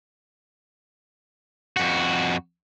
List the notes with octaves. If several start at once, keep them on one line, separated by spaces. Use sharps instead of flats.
F2 F#4